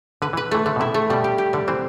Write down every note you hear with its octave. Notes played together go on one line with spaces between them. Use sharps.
D3 B4
E3
B4
E3 A3
D3 A3
B2
C3 E4
A3
B2 G3
G4
G4
D3 G3
E3 C4